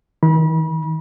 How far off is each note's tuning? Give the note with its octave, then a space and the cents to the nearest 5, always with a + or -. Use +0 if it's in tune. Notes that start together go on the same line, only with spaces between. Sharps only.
D#3 +45 B5 -35